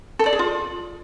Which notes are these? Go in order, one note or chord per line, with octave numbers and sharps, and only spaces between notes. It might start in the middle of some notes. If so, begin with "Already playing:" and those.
A4
D5
G#4
F4